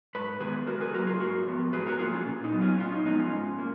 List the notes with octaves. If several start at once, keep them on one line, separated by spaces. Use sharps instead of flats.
G#2 B4
D#3 G#3 B3 G#4 B4
C#3 F#4 A#4
G#4 B4
F#3 A#3 F#4 A#4
F4 G#4
G#2 F#4 A#4
F3 B3
G#2 G#4 B4
F#4 A#4
F3 A#3 F4 G#4
C#4 F4
A#2
D#4
F#3 B3
C#4 F4
A#2 C#4 F4
D#4
F3 G#3 B3 D#4
C#4 F4
G#2
A#3